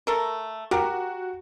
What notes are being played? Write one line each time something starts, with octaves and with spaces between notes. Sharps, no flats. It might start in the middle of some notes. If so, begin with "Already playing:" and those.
A3 A4 A#4
F#4 G4 A#4